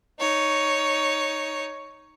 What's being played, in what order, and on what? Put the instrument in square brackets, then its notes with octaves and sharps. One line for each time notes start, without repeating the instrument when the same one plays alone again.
[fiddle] D#4 C#5